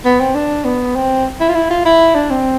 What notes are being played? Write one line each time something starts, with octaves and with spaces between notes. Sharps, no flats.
B3
C4
D4
B3
C4
E4
F4
E4
F4
E4
D4
C4